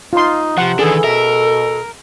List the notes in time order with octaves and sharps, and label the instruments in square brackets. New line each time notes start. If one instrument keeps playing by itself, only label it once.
[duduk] D#4 [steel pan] F4 C6
[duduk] C3 [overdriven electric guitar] F3 [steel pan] F#5
[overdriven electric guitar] D#3 D4 [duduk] E3 [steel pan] G#4 [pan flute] A4
[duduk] B2 [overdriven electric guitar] A#4 [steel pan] E5